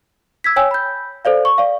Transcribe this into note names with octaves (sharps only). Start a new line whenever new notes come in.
E6 G#6 B6
C#5 G5 G#5 E6
B5 G6
A4 C5 D5 F5
C#6
D5 F5